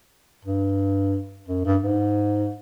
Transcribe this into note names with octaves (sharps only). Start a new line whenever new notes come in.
G2
F#2
G2
G#2